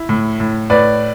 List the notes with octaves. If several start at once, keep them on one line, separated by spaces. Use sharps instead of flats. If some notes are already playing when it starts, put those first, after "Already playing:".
Already playing: E4
A2
A2
A2 B4 D5